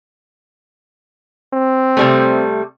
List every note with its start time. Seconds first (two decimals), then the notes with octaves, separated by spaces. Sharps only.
1.53 C4
1.97 C3 G3 A3